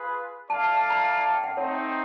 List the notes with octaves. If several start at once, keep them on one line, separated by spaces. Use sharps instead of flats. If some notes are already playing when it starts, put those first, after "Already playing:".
Already playing: F4 G#4 B4
E4 A4 D5 F5 A5
A5
A5
A#5
A5
A5
G5
F#5
A3 C4 D#4 C#5